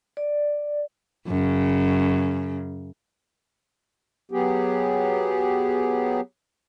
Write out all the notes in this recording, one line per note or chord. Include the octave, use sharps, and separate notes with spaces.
D5
F#2 C#3
F#3 B3 G4 G#4